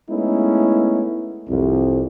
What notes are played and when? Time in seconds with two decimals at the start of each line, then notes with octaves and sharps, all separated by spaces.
0.10 G#3 A3 B3 C#4 D#4 E4
1.49 C2 F2